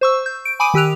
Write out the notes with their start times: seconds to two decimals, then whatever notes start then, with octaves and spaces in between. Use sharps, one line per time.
0.01 C5 C#6 E6
0.26 G6
0.45 D7
0.60 G#5 B5 D6 D#6 D7 D#7
0.74 D#3 G4 E6 F#6 F7